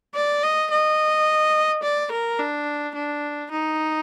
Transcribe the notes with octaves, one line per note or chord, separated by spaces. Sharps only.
D5
D#5
D#5
D5
A#4
D4
D4
D#4